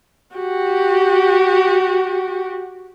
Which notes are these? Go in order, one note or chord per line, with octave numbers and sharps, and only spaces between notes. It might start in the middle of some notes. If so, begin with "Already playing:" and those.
F#4 G4